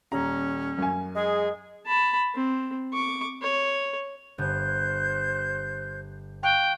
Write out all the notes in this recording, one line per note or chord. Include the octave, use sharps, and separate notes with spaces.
D#1 C#4 A#5
F#2 G#5
G#3 G#4
A5 B5
C4
C#6 D6
C#5
G1 C5 F#6 G6
F5 G5 C#6 F#6